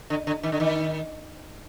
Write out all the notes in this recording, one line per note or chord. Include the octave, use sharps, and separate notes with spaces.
D3
D3
D#3
D3
D#3